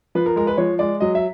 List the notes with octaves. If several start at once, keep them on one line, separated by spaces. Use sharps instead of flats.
F3 B4
A#4
G#3 A#4
B4
F3 C#5
G#3 D5
F#3 D#5
E5